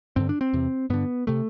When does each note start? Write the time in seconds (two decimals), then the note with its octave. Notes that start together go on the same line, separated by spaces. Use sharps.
0.16 G2 D3 C4
0.29 D4
0.41 C4
0.53 E2 C3
0.90 G2 D3 B3
1.27 C3 A3